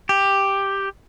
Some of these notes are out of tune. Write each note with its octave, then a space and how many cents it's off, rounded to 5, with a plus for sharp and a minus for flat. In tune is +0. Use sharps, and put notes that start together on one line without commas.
G4 +5